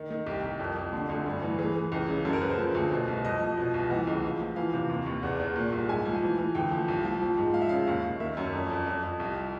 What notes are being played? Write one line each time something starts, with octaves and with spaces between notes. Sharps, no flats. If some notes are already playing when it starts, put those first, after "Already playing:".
Already playing: D#3
D#3
C2 G4
C2
F2
F2
D3
D2
G2
E3
E3 G#4
E3
C#2
C#3
F#2 A4
A#4
C#3 B4
C5
F3
D2
B2
C2
F2 D#5
F3
B2
C2
E3 F#5
C#2
F3
F3
E3 F5
C3
D#2
D#2
E2 F#5
E2
A#2
C2
G#2 G#5
F3
E3
E3
D2 G5
F3
C2
F3
F3
G#2
F3 F5
E5
C#3 F5
D#2
D#2
D#3 E5
F#2
F2
F2
F2
F2
C2